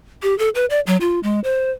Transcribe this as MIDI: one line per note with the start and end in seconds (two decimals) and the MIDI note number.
0.23 0.36 67
0.39 0.49 69
0.55 0.65 71
0.70 0.80 74
0.87 0.97 54
1.01 1.20 65
1.23 1.40 56
1.44 1.71 72